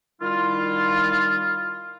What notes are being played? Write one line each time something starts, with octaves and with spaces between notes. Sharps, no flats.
D#3 G3 E4 F4